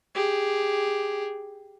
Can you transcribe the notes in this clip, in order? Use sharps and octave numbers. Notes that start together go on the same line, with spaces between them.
G4 G#4